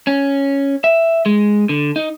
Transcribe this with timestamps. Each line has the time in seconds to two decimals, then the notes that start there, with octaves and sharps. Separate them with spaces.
0.07 C#4
0.84 E5
1.26 G#3
1.69 D3
1.96 D#4